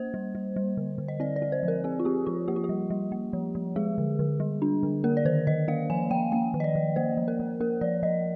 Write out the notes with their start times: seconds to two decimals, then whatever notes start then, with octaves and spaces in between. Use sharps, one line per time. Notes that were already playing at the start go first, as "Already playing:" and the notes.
Already playing: A#3 C5
0.14 G3
0.35 G3
0.56 G3
0.77 D3
0.98 D3
1.08 D#5
1.20 C4 D5
1.36 D5
1.42 C4
1.52 C5
1.63 F3
1.68 A#4
1.84 C4 G#4
1.99 F4
2.05 C4 G4
2.26 F3 F4
2.48 A#3 G4
2.56 F4
2.64 G4
2.69 G3
2.90 G3
3.12 A#3
3.33 F3
3.55 F3
3.76 G#3 G#4
3.98 D3
4.19 D3
4.40 G3
4.62 D4
4.83 D3
5.04 A#3 A#4
5.17 D5
5.25 D#3 C5
5.47 D#3 D#5
5.68 A#3 F5
5.90 F3 G#5
6.11 F3 G5
6.32 A#3 G5
6.54 D#3
6.60 D#5
6.64 D5
6.75 D#3
6.96 A#3 C5
7.17 F3
7.28 A#4
7.39 F3
7.60 A#3 A#4
7.81 F3 D5
8.03 F3 D#5